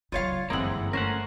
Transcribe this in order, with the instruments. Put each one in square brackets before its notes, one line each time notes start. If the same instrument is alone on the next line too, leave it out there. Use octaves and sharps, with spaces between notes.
[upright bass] C#3 F#3 [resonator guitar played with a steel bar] F4 C#5 F5
[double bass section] G1 C4 [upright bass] F#2 [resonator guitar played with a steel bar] E3 G#3 [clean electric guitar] A#3 E4 F#5
[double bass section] A3 [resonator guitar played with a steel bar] C#4 [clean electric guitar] A#4 C5 F#5